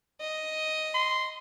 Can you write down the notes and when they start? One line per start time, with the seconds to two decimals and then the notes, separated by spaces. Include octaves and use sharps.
0.21 D#5
0.94 C6